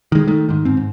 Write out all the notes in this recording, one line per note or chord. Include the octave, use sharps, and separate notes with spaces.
D#3 G#3
D#3 A3
G#2 D#3
G#2 C4
G#2